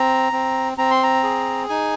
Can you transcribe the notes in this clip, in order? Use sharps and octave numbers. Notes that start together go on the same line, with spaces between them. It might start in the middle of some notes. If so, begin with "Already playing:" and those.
Already playing: C4 A#5
C4
C4 A#5
C6
A#5
G#4
D#4 G#5